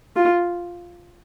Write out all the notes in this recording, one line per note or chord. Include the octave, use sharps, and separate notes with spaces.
F4